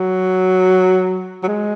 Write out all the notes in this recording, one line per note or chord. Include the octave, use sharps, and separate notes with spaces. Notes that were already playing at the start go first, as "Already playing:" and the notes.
Already playing: F#3
F#3
G#3